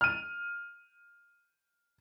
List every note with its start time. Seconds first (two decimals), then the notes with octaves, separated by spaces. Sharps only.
0.01 F6 D#7